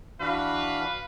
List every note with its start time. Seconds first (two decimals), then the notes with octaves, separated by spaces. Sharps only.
0.21 E3 D4 F#4 B4 F5